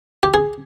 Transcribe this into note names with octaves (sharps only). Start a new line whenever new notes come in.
G4
G#4